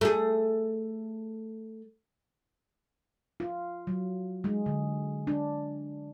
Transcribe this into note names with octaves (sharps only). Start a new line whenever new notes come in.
A3 G#4
F4
F#3
G#3
D3
D4